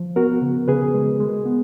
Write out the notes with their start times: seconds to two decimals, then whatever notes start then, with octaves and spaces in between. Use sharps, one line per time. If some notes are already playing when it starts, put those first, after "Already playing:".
Already playing: F3
0.16 B3 F#4 A#4
0.42 C#3
0.68 C#3 G#4 B4
0.94 G#3
1.20 G#3
1.45 B3